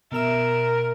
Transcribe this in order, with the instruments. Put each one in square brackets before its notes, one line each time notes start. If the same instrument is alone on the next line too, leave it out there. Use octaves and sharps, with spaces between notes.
[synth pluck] B2 E5 E7 [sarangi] A#4